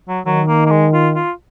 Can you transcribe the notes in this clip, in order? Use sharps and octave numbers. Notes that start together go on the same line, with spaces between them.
F#3
D#3 F#3
A#3
A#3
G#3
F4
F4